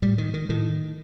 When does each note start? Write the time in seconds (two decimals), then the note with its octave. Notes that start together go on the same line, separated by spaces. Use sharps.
0.02 A2 G3
0.18 D#3
0.34 D#3
0.49 A2 D#3